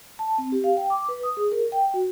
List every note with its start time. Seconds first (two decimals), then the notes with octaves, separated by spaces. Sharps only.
0.19 A5
0.38 C4
0.52 G4
0.64 F5
0.77 G5
0.90 D6
1.09 B4
1.23 D#6
1.37 G#4
1.52 A#4
1.72 G5
1.94 F#4